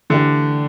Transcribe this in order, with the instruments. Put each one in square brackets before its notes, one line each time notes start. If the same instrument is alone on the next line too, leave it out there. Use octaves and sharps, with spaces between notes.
[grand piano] D3 [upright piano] E3 A3 D4 G4